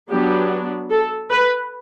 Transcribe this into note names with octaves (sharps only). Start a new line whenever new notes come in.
F#3 B3 D4 G4
A4
B4